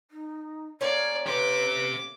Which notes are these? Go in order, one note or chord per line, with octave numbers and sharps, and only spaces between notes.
D#4
A3 A#3 C#4 C#5 D5
G4 B4 C5 D6